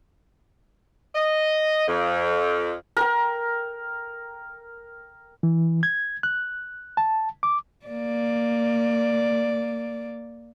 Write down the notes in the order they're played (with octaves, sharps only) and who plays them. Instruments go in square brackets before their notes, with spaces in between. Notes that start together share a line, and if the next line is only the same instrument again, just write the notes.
[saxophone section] D#5
F2
[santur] A#4 G5
[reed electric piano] E3
G#6
F#6
A5
D6
[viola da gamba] A#3 D5